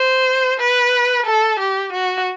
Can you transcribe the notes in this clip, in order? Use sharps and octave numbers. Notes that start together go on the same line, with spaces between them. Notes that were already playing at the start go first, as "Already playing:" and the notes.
Already playing: C5
B4
A4
G4
F#4